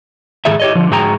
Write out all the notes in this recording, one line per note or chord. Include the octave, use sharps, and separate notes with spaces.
G#2 D#3 G#4 A4 E5
G4 C#5 D#5
D3 F3
G#2 F#4 G#4 G5 A#5